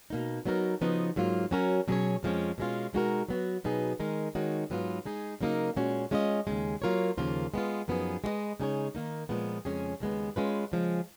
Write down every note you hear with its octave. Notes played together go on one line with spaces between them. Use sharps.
B2 A#3 D#4
F#3 B3 D#4 F#4 A#4
C#3 F3 B3 D#4 F#4
G#2 F#3 A#3 F4
F#3 C#4 F#4 A#4
B2 F#3 C#4 G#4 C#5
F2 F3 G#3 C#4
B2 G#3 C#4 F4
B2 G#3 D#4 F#4 A#4
F#3 B3 F#4
B2 F#3 B3 D#4 G#4
D#3 G#3 D#4 A#4
D#3 G#3 D#4 F#4 C#5
G#2 F#3 B3 F4
G#3 D#4 G#4
C#3 F#3 A#3 D#4 A#4
A#2 G#3 C#4 F#4
G#3 C#4 F4 B4 D#5
D#2 C#3 G#3
F#3 A#3 F4 A#4 C#5
D#2 C#3 F3 A#3 F4
G#3 B3 F4
F#2 F3 B3 D#4 G#4
G#3 B3 F#4 B4 D#5
C#3 G#3 D#4 G#4 C#5
D#3 A#3 D#4
A#2 F3 G#3 B3
F2 C#3 G#3 C#4 G#4
D#2 C#3 G#3 B3
G#3 C#4 F4 B4
C#3 F3 G#3